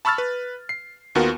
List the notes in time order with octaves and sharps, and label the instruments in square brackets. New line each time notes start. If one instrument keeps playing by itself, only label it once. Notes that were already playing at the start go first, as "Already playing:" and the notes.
[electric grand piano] A5 B5 C#6 E6 F6 A6
B4
C7
D#2 B3 F4 F#4 A#4